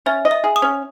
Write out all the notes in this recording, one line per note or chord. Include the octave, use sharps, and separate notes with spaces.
C#4 E5
D#5
E5
G#4
D#6
C#4